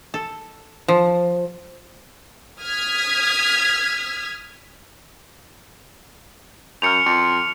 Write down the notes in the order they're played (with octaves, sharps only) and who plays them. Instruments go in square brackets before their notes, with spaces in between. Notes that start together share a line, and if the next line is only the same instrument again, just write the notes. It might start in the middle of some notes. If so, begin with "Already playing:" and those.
[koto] A4
F3
[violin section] D#6 F6 G#6 B6
[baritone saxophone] F#2 [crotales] F6 C#7 F7
[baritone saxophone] F2